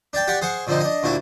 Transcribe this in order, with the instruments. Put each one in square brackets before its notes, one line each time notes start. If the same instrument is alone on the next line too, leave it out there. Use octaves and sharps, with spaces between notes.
[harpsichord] D4 D5 G5 A5
G4 D5 F#5 G5 C6 C#6
G#4 C5 F#5 C#6
A#2 D3 F3 C4 D#4
D4 D#5
D2 A#2 D4 E4 F#4